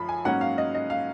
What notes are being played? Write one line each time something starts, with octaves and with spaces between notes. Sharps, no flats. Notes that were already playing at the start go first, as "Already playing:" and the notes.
Already playing: F#2 F3 B5
G#5
G#2 F#3 A#3 C#4 F#5
F5
D#5
D#5
F5